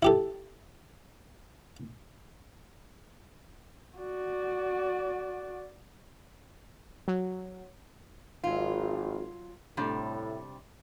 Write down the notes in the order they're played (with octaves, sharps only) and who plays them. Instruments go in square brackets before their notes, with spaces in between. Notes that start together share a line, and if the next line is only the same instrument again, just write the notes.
[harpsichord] E4 G4 A4
[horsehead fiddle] F#4 D5
[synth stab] F#3
[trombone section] G#1 [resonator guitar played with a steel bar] F#3 F4
[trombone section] A2 [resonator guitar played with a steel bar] C3 G3 D4